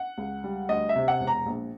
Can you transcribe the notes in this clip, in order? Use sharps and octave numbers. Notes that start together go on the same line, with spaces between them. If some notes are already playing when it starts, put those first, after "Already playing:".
Already playing: F#5
C#2
G3
D2 D#5
E5
C3
F#5
E1
A#5
A#1